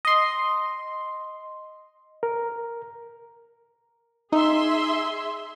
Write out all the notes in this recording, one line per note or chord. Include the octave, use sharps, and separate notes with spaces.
D#5 C6
A#4
D#4 G#4 E5 C6